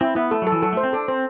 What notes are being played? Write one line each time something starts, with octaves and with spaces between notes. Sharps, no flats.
C4 E4
B3 E4
A3 A4
F#3 A4
E3
F#3 A4
A3 C5
C4
D4 A4
C4 C5